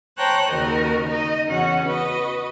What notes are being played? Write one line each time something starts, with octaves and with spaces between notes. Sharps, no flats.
C5 C#5 G5 A5 A#5 F#6
D#2 C#3 F#4 A#4 D#5
D#4 D#5
E2 C#3 C#4 F#4 F#5
F#4 B4 D#5